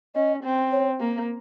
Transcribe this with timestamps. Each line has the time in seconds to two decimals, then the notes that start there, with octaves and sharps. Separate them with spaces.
0.15 C#4 D#5
0.44 C4
0.72 C#5
1.01 A#3